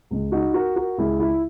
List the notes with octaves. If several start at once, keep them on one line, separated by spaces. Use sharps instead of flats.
C#2 C#3 G#3
D#4 F#4
F#4 A#4
F#4 A#4
C#2 C#3 G#3 E4 G#4
E4